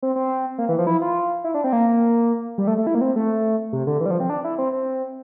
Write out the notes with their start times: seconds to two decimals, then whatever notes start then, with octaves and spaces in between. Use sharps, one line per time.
0.02 C4
0.16 C4
0.58 A#3
0.69 E3
0.78 F3
0.87 E4
1.02 F4
1.44 E4
1.54 D4
1.64 C4
1.73 A#3
2.58 G3
2.67 A3
2.78 A3
2.87 E4
2.95 A#3
3.01 C4
3.16 A3
3.73 C3
3.87 D3
4.00 E3
4.06 G3
4.11 F3
4.20 C4
4.30 D4
4.44 E4
4.58 C4
4.73 C4